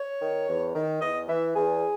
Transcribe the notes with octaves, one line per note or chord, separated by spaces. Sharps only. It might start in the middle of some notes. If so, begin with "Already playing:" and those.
Already playing: C#5
D#3
E2
D#3
E2 D#5
E3 E5
E2 G#4